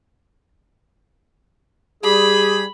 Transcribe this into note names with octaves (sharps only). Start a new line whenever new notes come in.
G3 G4 G#4 B5